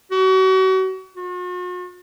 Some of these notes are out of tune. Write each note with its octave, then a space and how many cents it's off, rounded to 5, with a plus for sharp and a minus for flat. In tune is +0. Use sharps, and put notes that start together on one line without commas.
F#4 +35
F#4 -45